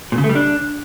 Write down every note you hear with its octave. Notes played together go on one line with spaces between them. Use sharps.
A#2
C#3
A3
G3
D4